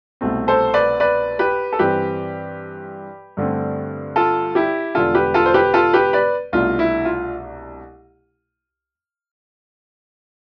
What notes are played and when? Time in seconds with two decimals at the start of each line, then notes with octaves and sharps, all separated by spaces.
0.21 C2 B2 A3 C4
0.48 A4 C5
0.74 B4 D5
1.00 B4 D5
1.39 G4 B4
1.72 A4
1.79 G2 E3 G3 C4 G4 B4
3.37 G2 D3 A3 C4
4.16 F4 A4
4.55 E4 G4
4.95 E1 E2 D3 G3 D4 F4 A4
5.15 G4 B4
5.34 F4 A4
5.46 C5
5.54 G4 B4
5.74 F4 A4
5.93 G4 B4
6.13 B4 D5
6.52 C2 B2 A3 D4 F4
6.79 E4
7.05 F4